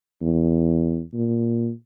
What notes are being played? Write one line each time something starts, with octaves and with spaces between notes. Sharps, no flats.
E2
A#2